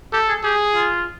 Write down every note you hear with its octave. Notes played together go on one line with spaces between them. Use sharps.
G4 A4
G#4
G4 G#4
F4